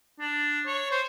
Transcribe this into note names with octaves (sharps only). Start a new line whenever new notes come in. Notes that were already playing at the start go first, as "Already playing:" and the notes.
D4
C#5
C5